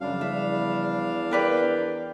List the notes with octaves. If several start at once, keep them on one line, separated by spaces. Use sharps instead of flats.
F#2 C#3 F3 G3 D4 F5
E2 E5
A#4 B4 D5 G5